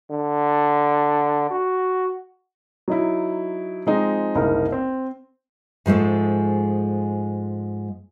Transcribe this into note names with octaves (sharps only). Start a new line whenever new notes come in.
D3
F#4
F#3 D#4 E4
F3 G#3 C4 D#4
F#1 C2 D#4 A#4
C4
G#2 F3 G#3 A3